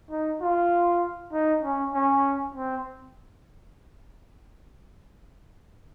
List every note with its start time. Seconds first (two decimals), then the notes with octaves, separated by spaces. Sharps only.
0.11 D#4
0.41 F4
1.33 D#4
1.63 C#4
1.94 C#4
2.55 C4